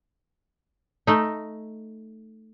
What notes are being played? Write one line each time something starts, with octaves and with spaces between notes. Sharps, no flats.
A3 D#4